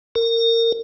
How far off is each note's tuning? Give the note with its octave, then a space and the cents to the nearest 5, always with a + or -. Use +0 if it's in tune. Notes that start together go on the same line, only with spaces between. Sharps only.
A#4 -25